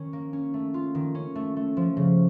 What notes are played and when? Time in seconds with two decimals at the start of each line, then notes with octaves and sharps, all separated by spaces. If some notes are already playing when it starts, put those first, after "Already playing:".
Already playing: D#3 C#4
0.13 A#3
0.33 C#4
0.54 A3
0.74 F4
0.95 D#3
1.15 C#4
1.35 A3
1.57 A3
1.77 F3
1.97 C#3